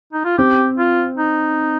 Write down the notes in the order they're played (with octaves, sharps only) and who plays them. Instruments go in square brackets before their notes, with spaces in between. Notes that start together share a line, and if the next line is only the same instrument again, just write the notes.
[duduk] D#4
F4
[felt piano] C4 [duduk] G4
[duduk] F4
D#4